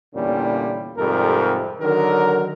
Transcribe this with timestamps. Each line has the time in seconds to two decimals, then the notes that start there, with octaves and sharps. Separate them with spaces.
0.14 E2 A#2 D3 G3 C#4
0.98 F2 G#2 C3 G3 A4 A#4
1.80 D3 D#3 F#3 A#4